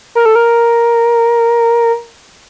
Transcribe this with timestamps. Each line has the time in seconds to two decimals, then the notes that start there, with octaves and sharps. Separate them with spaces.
0.15 A#4
0.26 A4
0.35 A#4